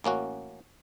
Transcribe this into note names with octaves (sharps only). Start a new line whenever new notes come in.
A1 A#3 C#4 F#4